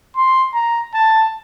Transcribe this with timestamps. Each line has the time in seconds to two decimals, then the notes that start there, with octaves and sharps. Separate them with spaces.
0.16 C6
0.54 A#5
0.94 A5